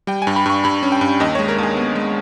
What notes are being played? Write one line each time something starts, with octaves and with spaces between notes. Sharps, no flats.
G3 G5
G#5
G2
B5
G2 C#6
G2 B5
C#4
G5
G2
D#2 D#5
G#3 C#5
A#4
D#2 G#4
B3
G#3